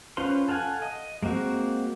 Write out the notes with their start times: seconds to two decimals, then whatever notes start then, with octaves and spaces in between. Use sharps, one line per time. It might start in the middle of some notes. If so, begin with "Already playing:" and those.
0.17 C#4 F4 B4 C5 C6
0.48 A4 F5 F#5 G#5
0.82 D#5
1.23 G#3 A#3 C4 F#4